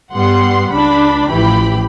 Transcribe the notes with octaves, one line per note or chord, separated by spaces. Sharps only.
G2 G3 B3 F#5 C6
C#2 D4 B5
A1 E3 F3 G4 B5